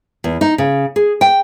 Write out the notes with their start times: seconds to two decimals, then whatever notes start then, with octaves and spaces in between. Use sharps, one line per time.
0.24 E2
0.41 D#4
0.58 C#3
0.96 G#4
1.21 G5